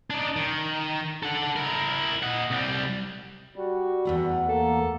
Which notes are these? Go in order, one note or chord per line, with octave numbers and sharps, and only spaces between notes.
D4 D#4
D#3
A4 F#5
E4 A#4
D#5 F#5
C2 G3
G3 F#4
E2 A3 F#5
A#3 A4